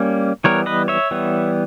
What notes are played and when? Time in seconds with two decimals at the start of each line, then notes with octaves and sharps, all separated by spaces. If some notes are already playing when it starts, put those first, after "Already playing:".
Already playing: G3 A#3 C#4
0.44 E3 G3 B3 A#4 C#5
0.66 B4 D#5
0.88 C#5 E5
1.11 E3 G3 B3